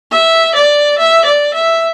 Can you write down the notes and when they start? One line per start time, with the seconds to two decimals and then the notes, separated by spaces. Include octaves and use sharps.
0.12 E5
0.55 D5
0.98 E5
1.25 D5
1.54 E5